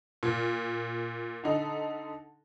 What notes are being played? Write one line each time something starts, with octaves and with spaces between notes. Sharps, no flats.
A#2
D3 D#4 A4